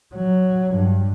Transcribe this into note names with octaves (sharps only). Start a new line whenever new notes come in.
F#3
G2